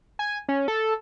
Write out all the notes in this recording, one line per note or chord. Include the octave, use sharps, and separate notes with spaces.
G#5
C#4
A4